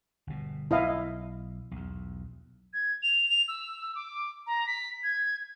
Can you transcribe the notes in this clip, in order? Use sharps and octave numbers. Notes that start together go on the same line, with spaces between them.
G1 B2
B1 E4 D#5 F5
B1 E2
G#6
F7
F7
E6
D6
A#5
B6
G#6